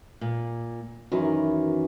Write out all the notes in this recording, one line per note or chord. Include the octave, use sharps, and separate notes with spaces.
A#2
F#2 D#3 E3